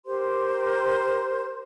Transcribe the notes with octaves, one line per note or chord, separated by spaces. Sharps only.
G4 A#4 C5 C6